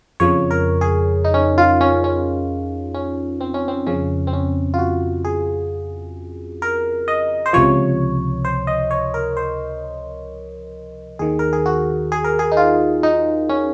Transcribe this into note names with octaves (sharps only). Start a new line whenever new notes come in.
F2 C#3 F3 C#5
A#4
G#4
D#4
C#4
F4
C#4
C#4
C#4
C4
C#4
C4
F2 C#3 F3 C#4
C4
C#4
F4
F#4
G#4
A#4
D#5
C5
C#2 C3 F3 C#5
C5
D#5
C#5
A#4
C5
D#2 D#3 G#4
A#4
G#4
F#4
G#4
A#4
G#4
D#4
F4
D#4
C#4